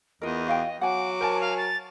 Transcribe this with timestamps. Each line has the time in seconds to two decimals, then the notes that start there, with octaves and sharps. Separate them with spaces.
0.22 E2 F4 A#4 D#5
0.47 F#4 F5 G5
0.81 F#3 F#5 G#5 D6
1.21 A#4 C5 G#5 A5
1.41 F5
1.57 A6